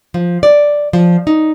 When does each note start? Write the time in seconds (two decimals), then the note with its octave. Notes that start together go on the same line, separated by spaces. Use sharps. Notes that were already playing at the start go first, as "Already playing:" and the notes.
0.14 F3
0.43 D5
0.93 F3
1.27 D#4